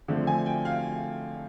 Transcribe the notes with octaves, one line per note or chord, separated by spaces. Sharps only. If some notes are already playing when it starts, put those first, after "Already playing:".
D3 F3 A3 C4
G#5
G5
F5